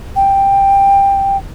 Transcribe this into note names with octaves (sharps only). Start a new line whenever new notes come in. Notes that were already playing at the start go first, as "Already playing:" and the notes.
G5